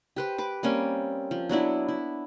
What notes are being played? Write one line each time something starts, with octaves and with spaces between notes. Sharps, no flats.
G4 B4 C5
B4 D6
G3 A#3 C4 C#4
F3
F#3 B3 D4 E4
E4